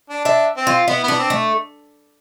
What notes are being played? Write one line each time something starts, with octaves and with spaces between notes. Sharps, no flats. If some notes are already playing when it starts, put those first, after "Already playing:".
D4
D4 E5
C4
F4
B3 E4
B3 D4
C4
A3